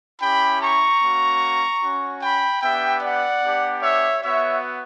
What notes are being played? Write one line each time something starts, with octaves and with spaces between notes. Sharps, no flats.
C#4 E4 G4 G5 B5
A#5 C#6
A#3 C#4 F#4
C#4 F#4
G5 B5
B3 D4 G4 E5 G5
D5 F#5
B3 D4 G4
C#5 E5
B3 F#4 C#5 E5